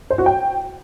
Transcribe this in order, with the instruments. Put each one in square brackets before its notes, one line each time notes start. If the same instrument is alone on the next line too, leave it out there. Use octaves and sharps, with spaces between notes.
[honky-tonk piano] C5
F#4
G5